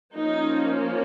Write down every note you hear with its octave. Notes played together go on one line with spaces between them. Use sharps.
F3 A#3 C#4 D#4